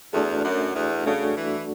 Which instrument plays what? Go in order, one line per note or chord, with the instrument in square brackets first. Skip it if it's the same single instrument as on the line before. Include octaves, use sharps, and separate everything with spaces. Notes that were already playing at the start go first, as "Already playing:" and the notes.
[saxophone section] E2 [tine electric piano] A3 D4 F#4 A4
[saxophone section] F#2
E2
[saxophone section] C#3 [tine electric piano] A3 D4 F#4 A4
[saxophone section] E3